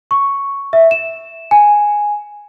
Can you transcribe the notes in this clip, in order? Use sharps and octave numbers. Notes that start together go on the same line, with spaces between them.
C#6
E5
E7
G#5